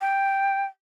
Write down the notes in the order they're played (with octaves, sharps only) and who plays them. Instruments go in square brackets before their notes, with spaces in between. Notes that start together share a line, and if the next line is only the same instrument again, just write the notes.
[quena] G5